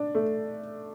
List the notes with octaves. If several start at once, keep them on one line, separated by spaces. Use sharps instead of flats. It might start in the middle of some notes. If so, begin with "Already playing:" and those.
Already playing: D4
A3